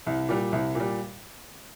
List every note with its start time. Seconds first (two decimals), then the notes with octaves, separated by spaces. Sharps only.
0.06 C2
0.29 A#2 G3
0.52 C2
0.75 A#2 G3